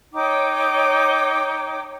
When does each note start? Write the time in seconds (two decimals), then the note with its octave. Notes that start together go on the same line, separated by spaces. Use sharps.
0.13 D#4 C#5 G5 D6